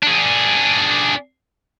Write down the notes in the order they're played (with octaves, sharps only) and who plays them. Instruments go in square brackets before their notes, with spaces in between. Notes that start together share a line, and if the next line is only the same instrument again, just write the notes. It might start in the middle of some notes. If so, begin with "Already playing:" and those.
[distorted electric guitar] D4 G#4